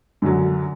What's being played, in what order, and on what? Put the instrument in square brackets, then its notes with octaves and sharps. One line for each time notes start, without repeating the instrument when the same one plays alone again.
[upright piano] F#2 D3 F#3